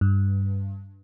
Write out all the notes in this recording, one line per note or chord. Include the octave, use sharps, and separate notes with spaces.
G2